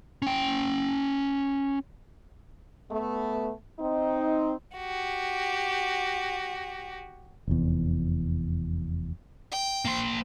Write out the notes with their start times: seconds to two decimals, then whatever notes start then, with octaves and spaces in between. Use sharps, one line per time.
0.22 C#4 G5
2.91 A3 B3
3.80 C4 D#4
4.77 F#4 G4
7.48 F1 E2
9.51 G5
9.85 A#3 C5